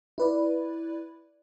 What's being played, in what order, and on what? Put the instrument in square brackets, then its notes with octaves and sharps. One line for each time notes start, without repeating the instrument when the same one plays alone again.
[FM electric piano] E4 B4 D5